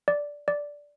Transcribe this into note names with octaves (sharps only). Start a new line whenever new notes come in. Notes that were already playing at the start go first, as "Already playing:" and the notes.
D5
D5